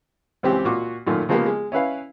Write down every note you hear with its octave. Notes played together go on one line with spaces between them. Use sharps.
C#2 E3 C4 C#4 G4
A#2 F#4 D6
F#2 A#2 D#3 A3
C#3 F3 G#3 A#3 B3 G4
G#3
C#4 E4 B4 F5